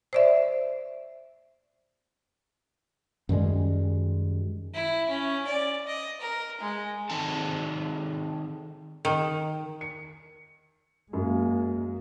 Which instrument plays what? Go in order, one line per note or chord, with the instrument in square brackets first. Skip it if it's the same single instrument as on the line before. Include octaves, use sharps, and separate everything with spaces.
[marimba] C5 D5 E5
[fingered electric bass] F#2 D#3 G3 G#3
[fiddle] E4
C#4
D5
D#5
A#4
G#3
[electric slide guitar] D#3 C4 D#4 G#4 A4 A5
[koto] D#3
[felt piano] C#7
[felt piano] F#2 [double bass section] G#3 A#3